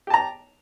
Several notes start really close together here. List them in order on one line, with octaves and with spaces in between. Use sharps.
G4 A5 A#5